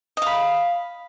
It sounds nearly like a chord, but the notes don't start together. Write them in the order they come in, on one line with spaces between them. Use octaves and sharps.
D#5 F5 B5